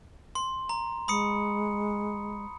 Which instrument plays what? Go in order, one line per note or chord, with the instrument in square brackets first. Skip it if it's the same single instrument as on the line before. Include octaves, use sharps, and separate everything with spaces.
[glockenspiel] C6
A#5
[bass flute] G#3 [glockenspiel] B5 D#6 C#7